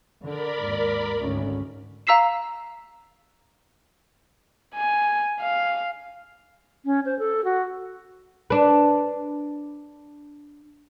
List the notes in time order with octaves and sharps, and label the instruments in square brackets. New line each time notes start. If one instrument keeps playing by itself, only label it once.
[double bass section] D3 [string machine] A#4 D5 B5
[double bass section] D#2 G#2
G#1 D2 C#4
[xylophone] F5 A#5 E6 B6 C7 E7
[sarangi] G#5
F5
[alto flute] C#4
C5
A4
F#4
[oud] D4 B4